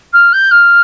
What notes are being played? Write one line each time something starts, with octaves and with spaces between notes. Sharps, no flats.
F6
G6
F6